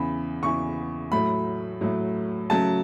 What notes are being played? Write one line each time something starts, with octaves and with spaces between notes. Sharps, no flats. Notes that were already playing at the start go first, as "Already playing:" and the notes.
Already playing: E2 C#3 E3 B5
E2 C#3 E3 C#6
A2 F#3 A3 B5
A2 F#3 A3
C#3 F#3 A3 A5